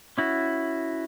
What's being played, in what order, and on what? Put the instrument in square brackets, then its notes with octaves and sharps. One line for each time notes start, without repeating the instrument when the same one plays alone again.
[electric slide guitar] C#4 E4 F#4